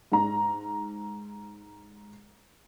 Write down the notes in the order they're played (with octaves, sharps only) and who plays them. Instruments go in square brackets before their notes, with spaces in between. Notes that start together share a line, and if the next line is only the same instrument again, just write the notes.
[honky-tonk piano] G#2 A#5